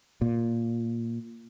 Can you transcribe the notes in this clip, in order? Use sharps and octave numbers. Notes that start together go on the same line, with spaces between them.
A#2